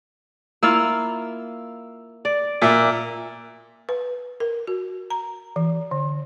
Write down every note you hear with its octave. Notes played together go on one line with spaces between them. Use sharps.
A#3 E4 F4 E6
D5
A#2 E5
B4
A#4
F#4
A#5
E3
D3